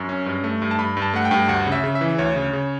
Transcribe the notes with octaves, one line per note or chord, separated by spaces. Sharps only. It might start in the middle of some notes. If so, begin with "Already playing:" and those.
Already playing: F#2 C#6
C#4
G2
A3
G2
A5
G2 B5
G2
A5
A3 F#5
G5
G2
D2 F#5
C#3
E5
C#3
E5
E3
D2 C#5
C#3
C#3